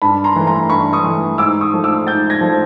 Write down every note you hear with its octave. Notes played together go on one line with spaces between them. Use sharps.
G2 A5 B5
A#5 C6
E3 A3
A#5 C6
G2 B5 C#6
C#6 D#6
E3 A3
G#2 D6 E6
C#6 D#6
F3 A3
D6 E6
G#2 G6 A6
G#6 A#6
F3 A3